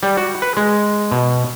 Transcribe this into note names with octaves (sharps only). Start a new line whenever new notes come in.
G3
F#4
B4
G#3
B2